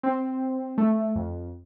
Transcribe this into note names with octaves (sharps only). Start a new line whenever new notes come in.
C4
A3
F2